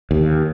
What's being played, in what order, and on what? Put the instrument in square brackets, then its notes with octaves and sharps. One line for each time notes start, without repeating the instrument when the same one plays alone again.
[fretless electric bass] D#2